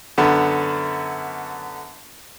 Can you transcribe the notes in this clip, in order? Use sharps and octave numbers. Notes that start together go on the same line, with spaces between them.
F#2 D3 B3